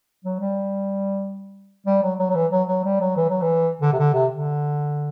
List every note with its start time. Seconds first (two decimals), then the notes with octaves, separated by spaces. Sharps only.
0.25 F#3
0.40 G3
1.86 G3
2.03 F#3
2.19 F#3
2.30 F#3
2.35 E3
2.52 F#3
2.68 F#3
2.84 G3
3.00 F#3
3.17 E3
3.30 F#3
3.42 E3
3.82 D3
3.93 C3
3.99 D3
4.14 C3
4.31 D3